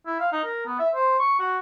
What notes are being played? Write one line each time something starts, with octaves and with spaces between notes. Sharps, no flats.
E4
F5
D#4
A#4
B3
E5
C5
C#6
F#4